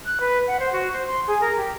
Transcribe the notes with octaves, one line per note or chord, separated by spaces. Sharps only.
F#6
B4
F#5
C5
F#4
C5
C6
G#4
A#4
G4